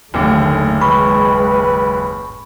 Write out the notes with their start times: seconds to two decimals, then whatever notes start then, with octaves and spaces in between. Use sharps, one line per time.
0.14 F#1 D#2 D3 D#3 A3
0.81 G#3 B4 B5 C#6